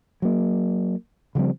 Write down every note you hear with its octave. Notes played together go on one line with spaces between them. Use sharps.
F#3 A#3
C#3 F3 G3 C4